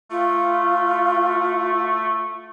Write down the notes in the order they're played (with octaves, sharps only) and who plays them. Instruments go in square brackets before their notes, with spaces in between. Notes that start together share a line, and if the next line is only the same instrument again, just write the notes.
[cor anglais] A3 [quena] F4